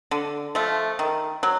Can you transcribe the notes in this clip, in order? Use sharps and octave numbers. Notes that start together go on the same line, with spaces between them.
D3
F3 A3
D#3
F#3